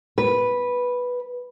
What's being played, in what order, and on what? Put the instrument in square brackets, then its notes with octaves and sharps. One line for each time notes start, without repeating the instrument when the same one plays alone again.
[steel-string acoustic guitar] B4